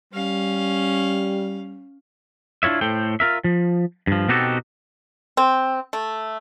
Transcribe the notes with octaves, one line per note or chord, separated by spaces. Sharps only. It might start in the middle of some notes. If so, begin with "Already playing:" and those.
G3 C#4 F5
D4 E4 F4 C#5 E5
A2 A4 C5 G5
F4 A#4 E5
F3
G2 F3
B2 C4 D#4 F#4 G4 A4
C4
A3